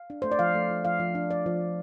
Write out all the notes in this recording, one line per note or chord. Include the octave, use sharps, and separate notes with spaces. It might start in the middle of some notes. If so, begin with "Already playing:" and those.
Already playing: F5
D4
A3 C5
D5
F3 F5
A3
F3
F3 F5
F3
D4
D4 D5
F3
D4